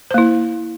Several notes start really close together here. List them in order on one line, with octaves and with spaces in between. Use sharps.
C5 A#3 E4